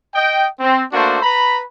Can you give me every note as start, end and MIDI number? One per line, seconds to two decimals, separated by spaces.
0.14 0.45 75
0.14 0.45 79
0.60 0.82 60
0.91 1.18 57
0.91 1.18 58
0.91 1.18 62
0.91 1.18 66
0.91 1.18 72
1.22 1.62 71
1.22 1.62 82
1.22 1.62 83